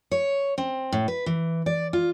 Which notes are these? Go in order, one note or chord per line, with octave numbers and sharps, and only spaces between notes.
C#5
C4
A2
B4
E3
D5
F4